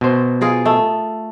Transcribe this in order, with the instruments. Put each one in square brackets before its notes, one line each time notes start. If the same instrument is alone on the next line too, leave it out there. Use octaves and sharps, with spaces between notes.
[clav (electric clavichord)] B2 C5
[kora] F4 G#4 A#4
A3